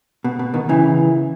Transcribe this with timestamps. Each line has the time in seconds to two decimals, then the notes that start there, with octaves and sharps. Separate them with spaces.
0.24 B2
0.39 B2
0.54 B2 D#3
0.69 C#3 E3